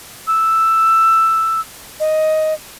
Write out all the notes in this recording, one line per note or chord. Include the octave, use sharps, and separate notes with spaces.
E6
D#5